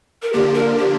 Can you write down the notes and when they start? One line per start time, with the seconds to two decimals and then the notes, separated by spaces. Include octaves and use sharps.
0.23 A#4
0.33 D3 F3 A#3 D4 G4
0.54 A#4
0.77 G4